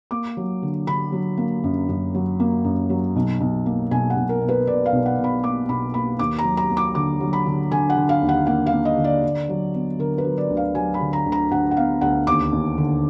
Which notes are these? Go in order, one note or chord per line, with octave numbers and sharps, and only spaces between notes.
A#3 D6
F#3
D3
D3 B5
F#3
A#3
F#2
F#2
F#3
A#3
F#2
F#3
B1
B1
A#3
B1 G#5
F#5
B1
A#4
B2
B4
B2 D5
F5
B1
F#5
B2
B5
A#3 D6
B1 B5
A#3 B5
D#2 D6
A#5
F#3
A#5
A#3
D6
D3 D6
F#3
B5
D3
D3 G#5
F#5
D3
F5
D#2
F#5
A#3 F#5
F5
A#3
D#5
D3
D5
D3
F#3
B3
D3 A#4
B4
F#3
D5
D2
F5
F#3 G#5
B5
D3
A#5
D2
A#5
D2 F#5
F#5
B3 F5
D2 F#5
D#2 D6
D#2
D3